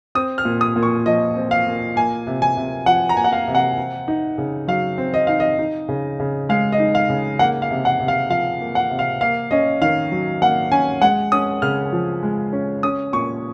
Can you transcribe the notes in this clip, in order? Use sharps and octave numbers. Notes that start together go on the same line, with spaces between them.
C4 D#6
F6
A#2
D#6
A#2
C#6
F3 D#5
C4
F5
A#2
A#3 G#5
C3
G#5
C3
F3 F#5
A#5
A#3 G#5
F#5
F5
C3
F#5
C4
D#4
C#3
F#3 F5
C4
D#5
D#4 F5
D#5
D#4
C#3
C#3
G#3 F5
D#5
D#4
F5
C#3
A#3 F#5
F5
C3
F#5
C3
F5
F3 F5
A#3
F#5
C3
F5
A#3 F5
C#4 D#5
D#3 F5
F#3
A#3 F#5
C#4 G#5
G#3 F#5
C#4 D#6
C#3 F6
F3
G#3
C#4
C#4 D#6
A#2 C#6